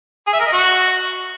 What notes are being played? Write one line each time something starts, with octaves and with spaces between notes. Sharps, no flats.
G#4
E5
A#4
D#5
F#4